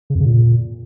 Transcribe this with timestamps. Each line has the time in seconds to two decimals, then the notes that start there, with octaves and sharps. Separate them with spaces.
0.10 C#3
0.15 F2
0.20 C#3
0.25 A#2